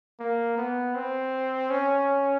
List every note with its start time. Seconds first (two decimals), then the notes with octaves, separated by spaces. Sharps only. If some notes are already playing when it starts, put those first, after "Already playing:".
0.20 A#3
0.58 B3
0.95 C4
1.70 C#4